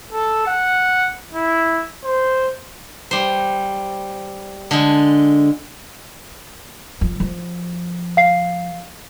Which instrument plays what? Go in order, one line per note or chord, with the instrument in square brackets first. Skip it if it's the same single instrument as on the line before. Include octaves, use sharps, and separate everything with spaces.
[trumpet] A4
F#5
E4
C5
[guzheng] G3 C5
D3 G#3
[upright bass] F3
F3
[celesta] F5 C7